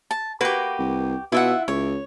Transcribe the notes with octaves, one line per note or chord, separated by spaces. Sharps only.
A5
A#3 F#4 G4 B4
C2
B2 E4 F4 E5 F#5
C#2 C#5